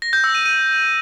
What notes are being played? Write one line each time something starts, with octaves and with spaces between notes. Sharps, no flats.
A#6
G6
E6
D#7
D#7